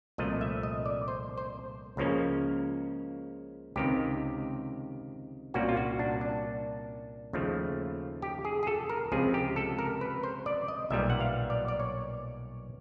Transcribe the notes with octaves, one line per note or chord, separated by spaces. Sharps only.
C2 A#2 F3 A3 D#5
E5
D#5
D5
C5
C5
C#2 C#3 F3 A#3 C#4
C#2 C3 D#3 G4
C2 A#2 G3 A#3 C#4 F#4
F4
F#4
D4
D4
D#2 C#3 F3 A3
G4
G#4
G#4
A4
A#4
C#2 C3 F3 G#4
G4
A4
A#4
B4
C5
D5
D#5
B1 A#2 G3 B3 E5
F#5
F5
D5
D5
C#5